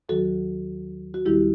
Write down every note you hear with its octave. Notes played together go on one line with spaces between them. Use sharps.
D#2 D#3 F#3 F#4 A4
F#4
D#2 D#3 G3 E4 G4